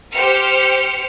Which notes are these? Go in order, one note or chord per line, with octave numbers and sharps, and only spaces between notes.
G4 C5 F6 C#7